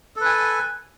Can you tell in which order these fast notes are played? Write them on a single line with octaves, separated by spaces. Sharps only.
A4 B4 G#5